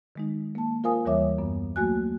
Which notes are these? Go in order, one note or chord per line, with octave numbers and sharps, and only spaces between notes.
D#3 G#3 D#4
A#3 A5
F4 A#4 C5 F5 G#5 D#6
D#2 E3 G3 C#5 E5 D6
F#2 B3
F#3 A3 A#3 F#4 G#5 F#6